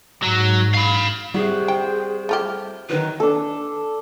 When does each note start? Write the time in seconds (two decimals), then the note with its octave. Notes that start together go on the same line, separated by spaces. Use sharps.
0.23 G#2 F#3
0.74 F5 B5
1.34 C3 G3 F#4 G#4
1.68 C5 G5
2.29 A3 F4 G4
2.90 D#3 F#3 B4
3.20 D4 A4